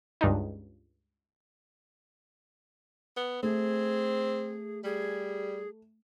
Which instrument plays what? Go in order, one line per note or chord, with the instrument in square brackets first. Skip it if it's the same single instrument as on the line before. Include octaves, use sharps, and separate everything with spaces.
[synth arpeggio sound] C#2 G2 D4 D#4
[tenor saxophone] B3
[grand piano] A3 [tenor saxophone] C4 [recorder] G#4
[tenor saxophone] G3 [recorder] G#4